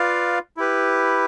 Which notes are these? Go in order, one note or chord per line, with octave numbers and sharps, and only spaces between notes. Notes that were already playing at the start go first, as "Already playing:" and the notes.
Already playing: F4 B4 D5 F5
E4 G4 B4